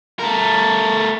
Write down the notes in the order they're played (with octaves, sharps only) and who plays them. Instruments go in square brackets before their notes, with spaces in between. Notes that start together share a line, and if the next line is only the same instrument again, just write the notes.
[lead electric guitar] A3 A#4